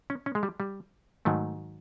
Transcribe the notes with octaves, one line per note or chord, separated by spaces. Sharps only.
C#4
C#4
G#3
G3
G3
G#2 D#3 F#3 A3